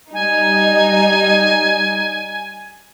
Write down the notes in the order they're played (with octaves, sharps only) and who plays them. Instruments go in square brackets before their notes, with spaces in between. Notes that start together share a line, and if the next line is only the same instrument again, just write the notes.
[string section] G3 D#4 [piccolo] G#5